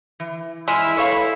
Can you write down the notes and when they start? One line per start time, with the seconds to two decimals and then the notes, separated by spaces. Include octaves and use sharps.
0.20 E3
0.68 G#3 E4 E6 F6 B6
0.97 A4 B4 C#5 E5 F5 B5